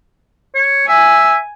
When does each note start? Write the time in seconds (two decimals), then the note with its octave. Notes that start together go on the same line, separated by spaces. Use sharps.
0.55 C#5
0.88 E5 G#5